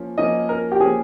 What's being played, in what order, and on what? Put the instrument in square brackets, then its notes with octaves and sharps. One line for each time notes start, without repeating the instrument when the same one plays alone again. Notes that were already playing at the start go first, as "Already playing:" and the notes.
Already playing: [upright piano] F3 A#3 C#4
[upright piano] F3 A#3 C#4 [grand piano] D#5
[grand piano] A#4
G4
[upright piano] F3 A#3 C#4 [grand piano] G#4